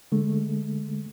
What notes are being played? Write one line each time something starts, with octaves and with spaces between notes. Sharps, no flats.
D3 G#3 A3